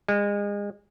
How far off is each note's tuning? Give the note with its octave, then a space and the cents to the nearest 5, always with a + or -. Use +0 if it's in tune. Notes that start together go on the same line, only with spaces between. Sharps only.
G#3 -30